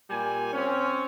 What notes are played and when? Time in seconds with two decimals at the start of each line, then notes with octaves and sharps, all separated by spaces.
0.10 A#2 G3 G#5
0.53 C4 C#4